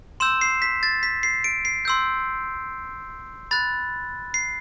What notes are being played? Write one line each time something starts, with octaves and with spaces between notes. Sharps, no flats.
C6 E6 G6 E7
C7
B6
A6
B6
C7
D7
C7
C6 E6 G6
B5 F#6 A6
C7